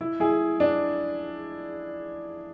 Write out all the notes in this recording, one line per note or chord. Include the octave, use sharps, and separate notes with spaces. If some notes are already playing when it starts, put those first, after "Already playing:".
E4
E4 G#4
D4